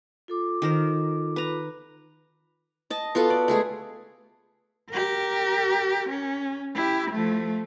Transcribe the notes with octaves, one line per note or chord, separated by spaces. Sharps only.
F4 A4 D6
D#3 A#4 C5
B4 A#5
D#5 A5
B3 F4 F#4 A4
D5
G#3 A3 G#4
G4 A#4
C#4
E4 G4
F3 A3